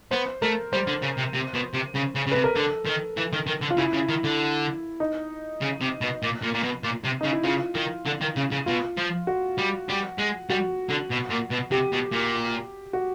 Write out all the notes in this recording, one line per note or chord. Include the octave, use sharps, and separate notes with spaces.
B3 C5
A3 A#4
G3 C5
D3
C#3
C3
C3
B2
C3
C#3
C#3
C#3
C3 B4
A#4
D3 A4
D#3
E3
D#3
D#3
D3
F4
C#3 E4
C#3
D#3
D3
D#4
C#3
C3
B2
A#2
A#2
A#2
B2
A#2
C3
C#3 D#4
E4
C#3 F4
D#3
D3
D#3
C#3
C#3
B2 F4
F3
F#4
G3
G3
G#3
G3 F#4
D3
B2
A#2
B2
C3 G4
B2
A#2
F#4